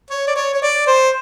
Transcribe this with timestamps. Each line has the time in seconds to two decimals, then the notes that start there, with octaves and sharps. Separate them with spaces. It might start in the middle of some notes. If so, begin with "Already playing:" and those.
0.10 C#5
0.27 D5
0.36 C#5
0.53 C#5
0.62 D5
0.87 C5